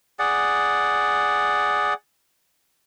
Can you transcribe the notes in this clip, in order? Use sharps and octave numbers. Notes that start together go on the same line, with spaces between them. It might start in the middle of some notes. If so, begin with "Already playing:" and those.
G#4 D5 F#5